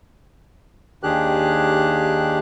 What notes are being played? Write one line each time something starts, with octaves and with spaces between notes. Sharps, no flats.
D#2 D#3 D4 G4 G#4 F#6